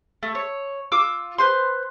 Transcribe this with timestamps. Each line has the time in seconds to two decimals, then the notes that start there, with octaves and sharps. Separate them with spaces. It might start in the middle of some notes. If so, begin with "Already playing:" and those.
0.23 A3
0.35 C#5
0.92 F4 D6 E6
1.38 B4 C5 C6